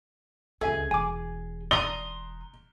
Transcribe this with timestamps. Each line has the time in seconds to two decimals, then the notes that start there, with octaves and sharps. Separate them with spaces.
0.61 C#2 D#3 G#4 A4 E5 G#5
0.91 E1 G#5 D6
1.71 D5 A#5 C6 D#6 G7